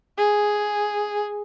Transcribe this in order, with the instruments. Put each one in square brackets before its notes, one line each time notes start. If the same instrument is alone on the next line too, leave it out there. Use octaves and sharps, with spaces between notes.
[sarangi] G#4